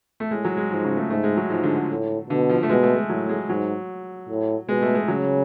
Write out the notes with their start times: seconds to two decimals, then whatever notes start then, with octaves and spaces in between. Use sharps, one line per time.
0.20 A3
0.31 A2 G#3
0.45 F#3
0.57 G#3
0.70 G#2 F3
0.84 C#3
0.97 A3
1.10 G#2 A3
1.24 G#3
1.37 F#3
1.50 G#2 F3
1.63 D3
1.90 A2
2.30 B2 D3
2.49 F3
2.63 A3
2.69 B2 G#3
2.83 A3
2.96 G#3
3.09 A2 F#3
3.29 G#3
3.49 G#2 F#3
4.29 A2
4.69 B2 G#3
4.82 A3
4.95 G#3
5.08 C#3 F#3